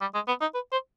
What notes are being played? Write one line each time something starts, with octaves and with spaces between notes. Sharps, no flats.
G3
G#3
B3
D#4
B4
C5